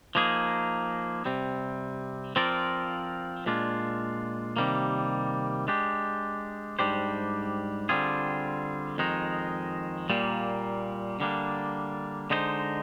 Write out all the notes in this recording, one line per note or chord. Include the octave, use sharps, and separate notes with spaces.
F3 A#3 D#4 G#4
C3 G3 C4
F3 C4 F4 A#4 D5
A#2 G#3 D4 F4
C3 D#3 G3 A#3
G#3 D4 G4
G#2 G3 D4 G4 C5
D3 G3 C4 F4 G#4
F2 D#3 G#3 D#4
A#2 G3 A#3
D3 G3 A#3 D4
D3 G#3 D#4 G#4 C5